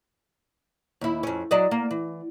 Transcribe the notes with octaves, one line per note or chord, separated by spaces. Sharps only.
D#2 E4
F2 C#4
F#3 D5 D#5
A#3
E3